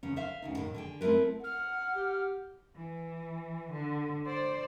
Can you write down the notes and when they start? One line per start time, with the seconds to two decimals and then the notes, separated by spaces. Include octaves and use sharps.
0.03 E2 C#3 C#4
0.16 C5 E5 F5
0.42 D2 C#3 D#4
0.57 A2 D#3
0.74 D3 G#4 G5
1.01 A3 C4 E4 A#4 B4
1.44 F#5 F6
1.95 G4
2.75 E3
3.72 D3
4.26 C5 D5